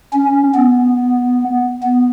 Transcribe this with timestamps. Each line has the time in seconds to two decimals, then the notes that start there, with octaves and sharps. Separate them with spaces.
0.13 C#4
0.55 B3
1.83 B3